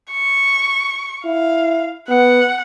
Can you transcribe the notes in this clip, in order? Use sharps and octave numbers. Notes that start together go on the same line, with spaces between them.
C#6
E4 F5
B3 F#5